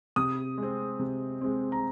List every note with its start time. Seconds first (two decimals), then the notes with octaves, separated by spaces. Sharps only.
0.16 C3 D#6
0.58 G#3
0.63 C4
0.99 C3
1.41 G#3 C4
1.72 A#5